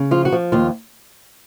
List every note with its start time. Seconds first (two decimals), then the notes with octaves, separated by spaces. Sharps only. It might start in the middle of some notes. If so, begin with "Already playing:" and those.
Already playing: C#3
0.11 F3 F4
0.25 F#4
0.32 F3
0.52 D#2 F4